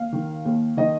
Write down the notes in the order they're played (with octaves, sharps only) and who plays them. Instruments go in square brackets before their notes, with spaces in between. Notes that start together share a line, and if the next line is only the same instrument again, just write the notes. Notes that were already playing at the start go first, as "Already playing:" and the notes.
Already playing: [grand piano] D#2 F5
D#3
D#2
D#3 D#5